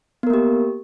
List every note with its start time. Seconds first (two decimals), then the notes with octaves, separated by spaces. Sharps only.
0.23 B3
0.27 A#4
0.30 A#3
0.34 G4